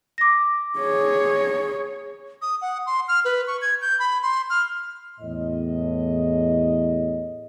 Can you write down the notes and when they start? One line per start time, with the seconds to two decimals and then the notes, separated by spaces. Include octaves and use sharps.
0.18 D6 A#6
0.79 G#4 C#5
2.42 D#6
2.62 F#5
2.86 C6
3.08 F6
3.25 B4
3.47 C#6
3.62 G#6
3.82 G6
4.00 B5
4.23 C6
4.50 F6
5.20 E2 A2 D#5